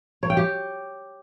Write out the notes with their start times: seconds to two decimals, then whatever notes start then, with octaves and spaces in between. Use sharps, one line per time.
0.23 C#5
0.30 G5
0.37 G4